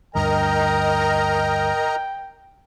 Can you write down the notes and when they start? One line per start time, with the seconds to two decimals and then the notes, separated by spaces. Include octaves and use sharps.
0.15 D2 G2 A#4 D#5 G5 A#5